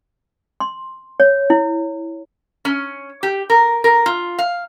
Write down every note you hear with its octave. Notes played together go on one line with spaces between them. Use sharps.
C6
C#5
E4
C#4
G4
A#4
A#4
F4
F5